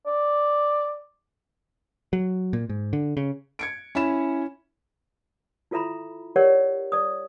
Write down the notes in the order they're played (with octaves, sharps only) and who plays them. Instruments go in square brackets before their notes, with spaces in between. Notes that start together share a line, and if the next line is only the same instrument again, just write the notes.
[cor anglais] D5
[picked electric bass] F#3
A#2
G#2
D3
C#3
[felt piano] G#6 C#7 D7
C#4 E4 B5 E7
[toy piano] E4 F4 A4 E5 A#5 B5
G4 A#4 C#5 D5 F#5
D5 D#6